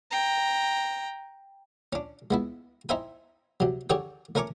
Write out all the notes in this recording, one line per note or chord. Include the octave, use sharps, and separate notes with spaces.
G5 A#5
C#4 D4
G#3 B3 E4
D#4 E4 C5 E5 G5 G#5
C3 F#3
D3 G4 G#4 C#5 D5 G5
A3 C#4 A#4 G#5 C#6 D6